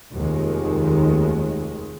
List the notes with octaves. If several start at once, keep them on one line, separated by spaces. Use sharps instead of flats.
F1 D#2 D#3 G#3